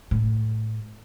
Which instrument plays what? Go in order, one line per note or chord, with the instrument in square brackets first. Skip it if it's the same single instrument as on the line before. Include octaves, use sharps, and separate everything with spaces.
[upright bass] A2